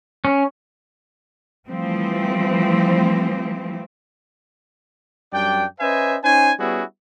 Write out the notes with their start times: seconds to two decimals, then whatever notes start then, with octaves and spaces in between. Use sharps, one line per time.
0.25 C#4
1.67 E3 F3 G3 A3 C4
5.33 F#2 G3 D4 D5 G5
5.80 C#4 B4 C5 D#5 E5 G#5
6.24 C#4 D#4 C5 G#5
6.60 G3 B3 C#4 E4 F#4 G#4